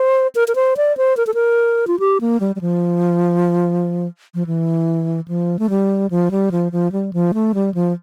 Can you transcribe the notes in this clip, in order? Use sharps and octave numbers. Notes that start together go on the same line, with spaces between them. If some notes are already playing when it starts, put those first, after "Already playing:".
Already playing: C5
A#4
A#4
C5
D5
C5
A#4
A4
A#4
F4
G4
A#3
G3
G3
F3
F3
E3
F3
A3
G3
F3
G3
F3
F3
G3
F3
A3
G3
F3